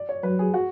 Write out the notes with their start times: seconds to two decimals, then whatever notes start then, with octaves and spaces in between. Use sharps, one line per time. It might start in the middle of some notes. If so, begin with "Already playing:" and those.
Already playing: D5
0.09 C#5
0.23 F#3 B4
0.39 G#4
0.54 F#4